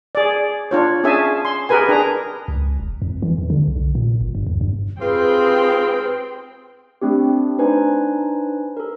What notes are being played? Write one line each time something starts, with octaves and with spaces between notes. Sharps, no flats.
G#4 D5
D4 F4 C#5
C#4 D4 G#4 E5 G#5 A5
C6
G4 G#4 A#4 B4 G#5
D4 G#4 A#5
C#2
E1
F2
E3
E2
D3
B1
A#2
G1
G2
E2
G2
G#2 C4 F4 G4 G#4 B4 G5
A3 C4 D4 G4
D4 D#4 B4 C5 G#5
A4 A#4